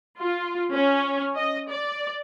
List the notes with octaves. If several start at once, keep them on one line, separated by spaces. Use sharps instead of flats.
F4
C#4
D#5
D5